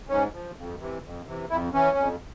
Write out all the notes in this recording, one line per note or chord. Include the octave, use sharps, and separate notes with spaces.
G#2 C#4
F3
F2
C3 E3
F2
C3 E3
F2 E4
E3 C#4
F2